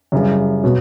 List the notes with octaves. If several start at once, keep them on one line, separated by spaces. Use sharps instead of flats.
F#2 C#3 E3 G3
B2 F#3